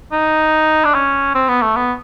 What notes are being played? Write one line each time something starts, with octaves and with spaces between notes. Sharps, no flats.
D#4
D4
C#4
C4
B3
A3
B3